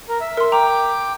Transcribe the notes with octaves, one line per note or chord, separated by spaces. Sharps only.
A#4
E5
A#4 C6
G5 A#5 D6